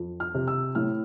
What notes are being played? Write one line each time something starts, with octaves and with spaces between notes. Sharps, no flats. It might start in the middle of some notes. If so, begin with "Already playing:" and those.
Already playing: F2
F6
C3
E6
A2 F6